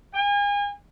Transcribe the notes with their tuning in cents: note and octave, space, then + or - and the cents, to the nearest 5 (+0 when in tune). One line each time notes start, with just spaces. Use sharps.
G#5 -35